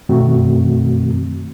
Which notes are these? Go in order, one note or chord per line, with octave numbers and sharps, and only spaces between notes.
F#2 B2 D#3 A3 C4 F#4